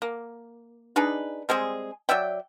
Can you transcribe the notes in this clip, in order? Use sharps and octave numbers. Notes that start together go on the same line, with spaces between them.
A#3
D4 D#4 G#4 B4
G3 G#3 C4 G#4
F#3 D5 E5 G5